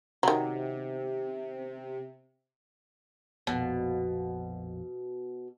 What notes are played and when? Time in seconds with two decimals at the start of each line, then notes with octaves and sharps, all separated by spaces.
0.23 C3 D#3 F#3
3.47 A#1 F2 B2